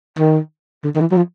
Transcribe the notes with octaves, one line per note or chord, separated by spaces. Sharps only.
D#3
D3
D#3
E3
F#3
F3